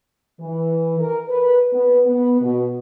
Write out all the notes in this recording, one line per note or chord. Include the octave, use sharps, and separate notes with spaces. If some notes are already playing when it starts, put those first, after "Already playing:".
E3
A#4
B4
B3
B3
B2